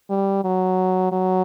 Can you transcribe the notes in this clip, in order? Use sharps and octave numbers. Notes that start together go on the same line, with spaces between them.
G3
F#3
F#3